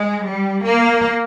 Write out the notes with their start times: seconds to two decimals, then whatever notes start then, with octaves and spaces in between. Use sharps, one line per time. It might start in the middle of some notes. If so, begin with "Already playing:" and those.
Already playing: G#3
0.26 G3
0.65 A#3